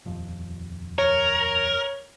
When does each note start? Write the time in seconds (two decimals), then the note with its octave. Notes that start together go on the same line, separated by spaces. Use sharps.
0.05 D#1 F2
0.98 A#4 C#5